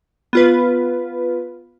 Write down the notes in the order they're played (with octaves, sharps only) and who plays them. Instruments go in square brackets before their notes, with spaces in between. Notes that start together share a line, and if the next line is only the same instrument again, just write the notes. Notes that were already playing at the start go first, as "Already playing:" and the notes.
[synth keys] B3 F4 B4